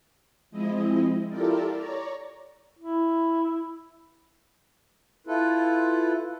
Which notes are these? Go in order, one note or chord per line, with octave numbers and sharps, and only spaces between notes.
F3 G#3 C4 E4 D#5
E4 F4 G4 A4 A#4 D5
C#5 D5 A#5
E4
E4 F4 A4 B4